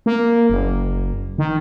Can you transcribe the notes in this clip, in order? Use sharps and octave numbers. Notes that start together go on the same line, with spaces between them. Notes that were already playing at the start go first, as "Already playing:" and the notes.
A#3
F#1
D#3